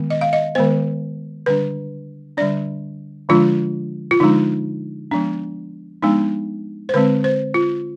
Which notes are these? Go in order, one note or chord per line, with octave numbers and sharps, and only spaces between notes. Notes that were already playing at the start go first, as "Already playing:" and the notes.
Already playing: D#3 G#3 B3
D#5
F5
D#5
D#3 G#3 B3 C5
D3 G3 D4 B4
D3 G3 D4 D5
D3 F3 G#3 D4 F4
F4
D3 F3 G#3 D4 D#4
F3 G#3 B3 D4
F3 G#3 B3 D4 D#4
C5
D3 G#3 C4 B4
C5
F4